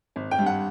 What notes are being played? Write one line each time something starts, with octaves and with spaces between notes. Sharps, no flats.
G#1
G5
G2
F#5